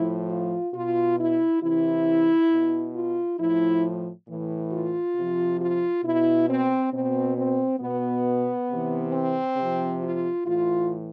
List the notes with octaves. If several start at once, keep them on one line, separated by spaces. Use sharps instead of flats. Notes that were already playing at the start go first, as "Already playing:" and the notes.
Already playing: A2 F3 E4
F4
B2 F4
E4
C3 E3 E4
B2
F4
A2 F3 E4
A2 E3
F4
C3
F3
F4
B2 E4
C4
B2 C4
C4
B2 B3
C3 E3
C4
C3 F3
F4
A2 E3 F4